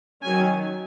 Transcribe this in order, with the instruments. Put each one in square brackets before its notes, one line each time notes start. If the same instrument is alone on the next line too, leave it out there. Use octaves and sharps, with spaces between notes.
[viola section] D#3 F#3 C#4 G#5